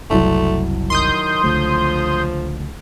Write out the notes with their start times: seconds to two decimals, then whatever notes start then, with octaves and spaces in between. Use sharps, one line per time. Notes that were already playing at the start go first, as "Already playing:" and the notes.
0.10 F#1 C2 F#3 A3 E4 A5
0.90 D#3 C6 D#6 G6
1.44 C#2 D3 F3 A3